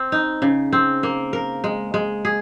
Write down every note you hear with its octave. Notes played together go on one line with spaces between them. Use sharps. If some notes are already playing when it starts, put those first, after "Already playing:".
Already playing: C4
D#4
C#3
C4
A#3
A#4
G#3
G#3
G#4